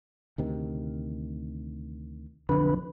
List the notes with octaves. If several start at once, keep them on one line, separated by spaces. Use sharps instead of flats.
D2 C3 D#3
B1 F2 D3 B4